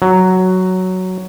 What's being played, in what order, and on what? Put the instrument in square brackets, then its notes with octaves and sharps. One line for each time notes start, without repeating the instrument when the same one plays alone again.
[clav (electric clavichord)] F#3